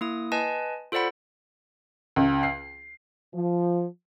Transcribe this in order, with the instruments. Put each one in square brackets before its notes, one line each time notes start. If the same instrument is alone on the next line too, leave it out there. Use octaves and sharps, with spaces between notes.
[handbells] A#3 E4 D#6
B4 D#5 G#5 A5
F4 A4 C5 D5 F#5 B5
[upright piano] C#2
C7
[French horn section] F3